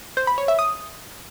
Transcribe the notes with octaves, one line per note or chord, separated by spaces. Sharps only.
C5
B5
C#5
E5
D#6